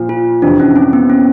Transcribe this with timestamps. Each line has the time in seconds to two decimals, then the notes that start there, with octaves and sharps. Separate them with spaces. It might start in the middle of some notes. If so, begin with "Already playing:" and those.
Already playing: A#2 F3
0.09 F4
0.42 F2 C3 E3 D4
0.60 C#4
0.76 C4
0.93 B3
1.10 C#4